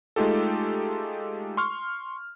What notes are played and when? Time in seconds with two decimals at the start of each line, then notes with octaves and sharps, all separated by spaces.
0.16 G#3 A3 D#4 F4 G4 A4
1.57 C6 C#6 F6